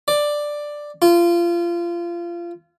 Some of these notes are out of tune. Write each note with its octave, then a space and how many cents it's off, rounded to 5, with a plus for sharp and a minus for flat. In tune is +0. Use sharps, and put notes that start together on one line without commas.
D5 +5
F4 -25